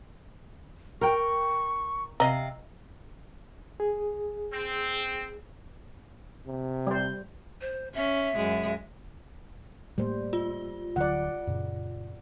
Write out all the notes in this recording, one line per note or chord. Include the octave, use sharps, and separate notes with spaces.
A#4 G5 C#6
C3 D#5 F5 A#5
G#4
C4
C3
G3 C5
C5
C#4 E5
F#2 G#3
A2 G3 A3 A#3 C5
F4
D1 D3 F#3 D5 F#5
F#2 A#2 C#3